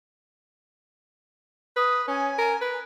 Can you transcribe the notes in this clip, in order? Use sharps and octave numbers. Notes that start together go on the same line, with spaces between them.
B4 D#6
C#4 G#5
A#4
B4